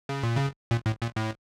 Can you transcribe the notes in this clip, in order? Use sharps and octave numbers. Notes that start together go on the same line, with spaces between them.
C#3
A#2
C#3
A#2
A2
A#2
A2